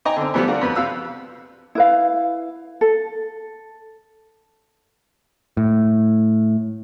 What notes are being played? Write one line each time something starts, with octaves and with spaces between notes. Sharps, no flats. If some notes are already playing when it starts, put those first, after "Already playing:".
D#4 D#5 G5 G#5 A#5
D3 C4
E3 F3 G3 A3 B3
D4 F4 F#4 A#4
F2 B3 B4 B5
C3 F5 E6 F#6
E4 B4 F5
A4
A2